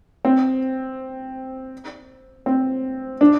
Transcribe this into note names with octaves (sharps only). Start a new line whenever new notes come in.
C4
C4
D4